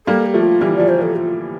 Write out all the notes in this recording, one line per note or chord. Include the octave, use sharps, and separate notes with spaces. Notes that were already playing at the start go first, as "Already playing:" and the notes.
G3 A#3 A4
G4
F3 A3
F4
E3 G3 E4
F3 D5
C5
F3 A4
F4